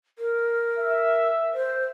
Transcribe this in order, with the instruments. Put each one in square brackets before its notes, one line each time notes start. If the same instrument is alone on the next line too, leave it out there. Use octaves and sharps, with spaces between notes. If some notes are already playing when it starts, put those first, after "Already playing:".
[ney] A#4
[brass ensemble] E5
[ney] C5